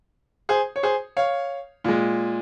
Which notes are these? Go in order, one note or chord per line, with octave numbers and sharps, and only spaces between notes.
G#4 C5
C#5
G#4 C5
C#5 F5
A#2 G#3